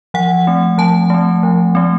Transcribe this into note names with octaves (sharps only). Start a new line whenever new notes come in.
F3 F#5
A3 C4
F3 A5
A3 C4
F3
A3 C4